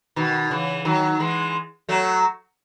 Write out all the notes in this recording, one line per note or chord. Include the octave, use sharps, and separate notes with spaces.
B2 D#3
C#3 E3
D#3 F#3
E3 G#3
F#3 A3